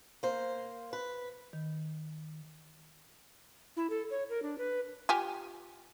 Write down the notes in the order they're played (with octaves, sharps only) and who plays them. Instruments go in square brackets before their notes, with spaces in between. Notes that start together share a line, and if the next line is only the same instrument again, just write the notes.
[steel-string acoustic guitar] A#3 C5
B4
[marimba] D#3
[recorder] E4
A4
C#5
A#4
D4
B4
[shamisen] F4 G4 G#5